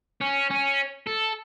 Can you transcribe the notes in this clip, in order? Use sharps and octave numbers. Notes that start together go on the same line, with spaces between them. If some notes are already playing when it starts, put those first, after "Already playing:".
C#4
C#4
A4